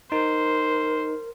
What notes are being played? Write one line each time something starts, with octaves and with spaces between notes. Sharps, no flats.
D#4 A#4 C5